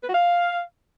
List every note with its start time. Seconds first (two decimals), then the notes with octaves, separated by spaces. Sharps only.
0.04 B4
0.09 F#4
0.15 F5